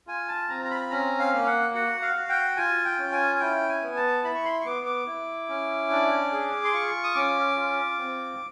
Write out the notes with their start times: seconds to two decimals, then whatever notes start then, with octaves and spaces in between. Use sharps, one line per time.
0.07 F4 G#5
0.28 A5
0.49 C4 A#5
0.65 A#5
0.71 B5
0.91 C#4 A#5
1.19 F5
1.33 A#3 F5
1.46 F#5
1.74 F#4 F#5
2.02 F5
2.15 F#4
2.29 G5
2.57 F4 G#5
2.85 G5
2.98 C#4
3.12 G#5
3.35 G#5
3.40 E4 G5
3.69 G#5
3.82 B3
3.96 A5
4.23 E4 B5
4.35 C#6
4.45 C6
4.61 C#6
4.65 B3 D6
4.86 D6
5.07 E4
5.49 C#4
5.91 D4
6.32 G#4
6.65 C6
6.73 F4 C#6
7.04 D#6
7.15 C#4 D6
7.56 F4
7.99 C4